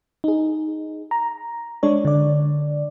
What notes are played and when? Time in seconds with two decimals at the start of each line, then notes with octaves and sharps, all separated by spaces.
0.24 D#4 G#4
1.11 A#5
1.83 G#3 D4 C#5
2.05 D3 D5